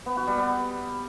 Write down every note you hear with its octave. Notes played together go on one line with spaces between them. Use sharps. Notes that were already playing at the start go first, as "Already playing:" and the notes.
B3
F#4
G3
B3